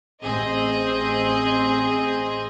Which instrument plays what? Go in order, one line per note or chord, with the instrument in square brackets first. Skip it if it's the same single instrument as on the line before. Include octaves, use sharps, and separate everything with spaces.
[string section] A1 C4 G#4 D#5